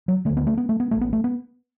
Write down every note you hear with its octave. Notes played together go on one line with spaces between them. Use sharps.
F#3
D2 D3 A3
B3
A3
B3
A3
B3
A1 A2 A3
B3
A3
B3